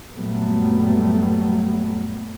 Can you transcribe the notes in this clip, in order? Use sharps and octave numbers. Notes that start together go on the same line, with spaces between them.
F#2 A#2 F#3 G3 A3 B3